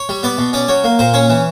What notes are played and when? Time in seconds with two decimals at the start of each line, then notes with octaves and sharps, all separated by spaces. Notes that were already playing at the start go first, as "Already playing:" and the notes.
Already playing: C#5
0.09 G3
0.23 B3 D5
0.38 B2
0.53 C#4 D5
0.68 F#3 C#5
0.84 A#3
0.99 A#2 C5
1.14 C#4 C#5
1.30 E3